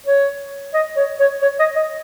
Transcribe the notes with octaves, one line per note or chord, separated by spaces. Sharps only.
C#5
D#5
C#5
C#5
C#5
D#5
D#5